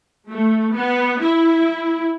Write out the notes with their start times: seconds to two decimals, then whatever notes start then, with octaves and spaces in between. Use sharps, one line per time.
0.28 A3
0.73 B3
1.19 E4